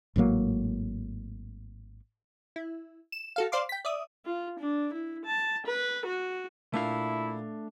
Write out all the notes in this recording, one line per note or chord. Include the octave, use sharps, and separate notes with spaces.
G#1 A2 F#3 A#3
E4
E7
F#4 A4 F5
C5 D5 F5 C6 D6
G5 B6
D5 E5 D#6
F4
D4
E4
A5
B4
F#4
A#2 A3 D4 E4 F5